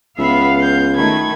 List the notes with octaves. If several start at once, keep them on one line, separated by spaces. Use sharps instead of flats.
C#2 B3 E5 F5 B5
G6
D#3 A3 B5 G#6